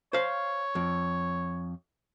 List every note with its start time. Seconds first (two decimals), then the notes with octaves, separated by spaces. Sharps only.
0.13 C5 C#5 F5
0.75 F2